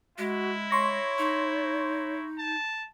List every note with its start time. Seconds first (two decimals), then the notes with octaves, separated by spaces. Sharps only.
0.18 G#3 E4 F#4
0.71 C#5 C6 C#6 A#6
1.18 D#4
2.38 A5